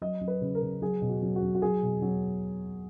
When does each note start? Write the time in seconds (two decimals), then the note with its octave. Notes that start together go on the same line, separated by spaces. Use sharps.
0.01 F#3 D#5
0.21 F#3
0.28 B4
0.41 C#3
0.55 A#4
0.62 C#3
0.82 F#3 G#4
1.02 B2
1.09 F#4
1.22 F#3
1.36 F#4
1.42 F#3
1.55 F#4
1.62 F#3 G#4
1.82 B2
2.02 F#3